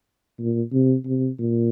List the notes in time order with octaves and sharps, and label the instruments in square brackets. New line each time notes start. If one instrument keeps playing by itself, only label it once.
[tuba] A#2
C3
C3
A#2